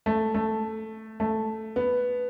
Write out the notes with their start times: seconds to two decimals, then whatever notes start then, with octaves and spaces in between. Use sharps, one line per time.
0.06 A3
0.34 A3
1.20 A3
1.76 B3